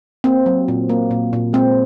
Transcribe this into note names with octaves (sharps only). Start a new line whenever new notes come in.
A#3 C4
F#3
A#2
A#3
A#2
A#2
G#3 C4